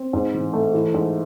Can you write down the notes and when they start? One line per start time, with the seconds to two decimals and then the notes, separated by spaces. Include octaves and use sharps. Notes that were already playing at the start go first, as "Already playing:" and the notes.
Already playing: C4
0.13 G#2
0.34 A1
0.53 A3
0.74 E3
0.94 G#2